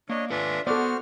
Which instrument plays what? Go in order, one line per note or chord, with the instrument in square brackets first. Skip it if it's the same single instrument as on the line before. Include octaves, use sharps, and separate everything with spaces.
[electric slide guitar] A#3 [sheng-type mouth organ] D4 C#5 D#5
[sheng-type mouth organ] D4 F4 E5 [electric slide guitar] A4 B4 G#5
[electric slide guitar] B3 [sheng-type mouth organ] F#4 C5 F6 [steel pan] A4 D5